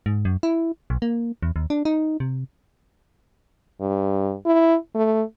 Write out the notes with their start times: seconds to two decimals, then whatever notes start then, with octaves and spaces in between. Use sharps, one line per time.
0.06 G#2
0.25 F#2
0.43 E4
0.90 B1
1.02 A#3
1.43 E2
1.56 D#2
1.70 D4
1.85 D#4
2.20 C3
3.80 G2
4.46 E4
4.95 A3